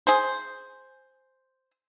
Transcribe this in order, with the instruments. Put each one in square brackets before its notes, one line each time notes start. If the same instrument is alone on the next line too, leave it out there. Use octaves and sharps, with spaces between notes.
[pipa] G#4 C5